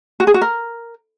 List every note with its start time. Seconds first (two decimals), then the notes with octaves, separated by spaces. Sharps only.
0.20 F#4
0.27 G#4
0.34 F#4
0.42 A#4